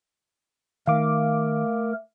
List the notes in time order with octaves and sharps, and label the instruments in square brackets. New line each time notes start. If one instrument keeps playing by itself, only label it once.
[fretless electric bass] D#3 [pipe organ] A3 A#4 [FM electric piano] F5 D6